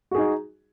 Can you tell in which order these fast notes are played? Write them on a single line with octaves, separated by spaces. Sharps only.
F#4 G#4 D#4